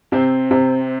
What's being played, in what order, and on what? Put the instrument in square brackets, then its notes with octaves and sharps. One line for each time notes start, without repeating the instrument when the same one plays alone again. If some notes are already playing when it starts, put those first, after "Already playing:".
[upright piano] C3 [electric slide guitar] C4
[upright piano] C3